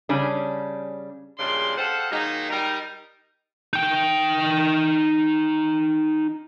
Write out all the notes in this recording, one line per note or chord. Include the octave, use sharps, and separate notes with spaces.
C#3 G3 C#4 D4
G2 A#2 C#3 G#3 D5 C6
G4 A4 C5 F5 F#5
D#3 F#3 G#3 A#3 D#4
G3 D#4 A#4
D#4 G5